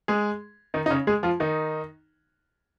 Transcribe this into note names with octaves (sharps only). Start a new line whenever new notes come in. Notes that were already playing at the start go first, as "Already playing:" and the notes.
G#3 G#4
D#3 D#4
D#4
C#3 C#4
G#3 G#4
F3 F4
D#3 D#4